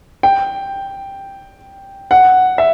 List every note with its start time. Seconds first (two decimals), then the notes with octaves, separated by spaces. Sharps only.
0.23 G5
2.11 F#5
2.58 E5